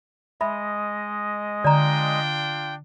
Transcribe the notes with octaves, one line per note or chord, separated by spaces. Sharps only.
G#3 D#5 E5 B5
D3 D4 F4 D5 G5 A#5